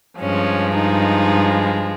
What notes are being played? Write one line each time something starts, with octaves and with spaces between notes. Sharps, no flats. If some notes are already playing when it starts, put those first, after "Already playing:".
G2 F3 G#3 C#4
D#4